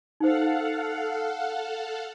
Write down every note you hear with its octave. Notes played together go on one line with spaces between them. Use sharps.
D#4 A4 C5 F5 F#5